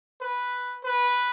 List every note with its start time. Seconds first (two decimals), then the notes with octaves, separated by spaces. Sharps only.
0.21 B4
0.84 B4